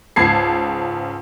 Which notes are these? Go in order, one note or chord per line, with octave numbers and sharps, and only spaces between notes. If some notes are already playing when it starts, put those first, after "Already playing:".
C#2 G#2 A5 G#6 C7